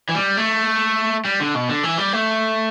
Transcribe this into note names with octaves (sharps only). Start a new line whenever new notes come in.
E3
G3
A3
G3
D3
B2
D3
E3
G3
A3